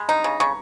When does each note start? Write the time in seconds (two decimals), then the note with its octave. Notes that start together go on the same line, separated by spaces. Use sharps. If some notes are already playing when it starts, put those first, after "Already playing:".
Already playing: G#3 B5
0.09 D#4 A#5
0.24 C#3
0.40 C#3 C#6